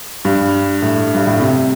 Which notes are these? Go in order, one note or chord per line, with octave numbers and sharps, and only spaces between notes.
G2
A2
G2
A2
C3